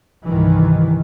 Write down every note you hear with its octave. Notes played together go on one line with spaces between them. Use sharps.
C2 G2 D#3 E3